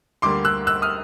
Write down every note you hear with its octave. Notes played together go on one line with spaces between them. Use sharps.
D2 D3 G3 A#3 C6 D6
E6 F#6
E6 F#6
D#6 F6